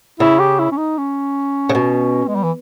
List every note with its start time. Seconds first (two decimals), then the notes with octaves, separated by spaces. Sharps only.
0.20 C#3 E4
0.39 G4
0.59 E4
0.72 C#4
0.77 D#4
0.98 C#4
1.69 C#3
1.75 B2
2.28 G#3
2.36 G3
2.44 E3